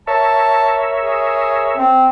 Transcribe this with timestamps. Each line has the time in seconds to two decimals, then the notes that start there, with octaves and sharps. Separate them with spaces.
0.07 A#4 C#5 E5 A5
1.00 G#4
1.77 C4